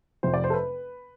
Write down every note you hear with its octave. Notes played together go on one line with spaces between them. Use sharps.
F1 F2 C3 F3 C5
D5
C5
A4
B4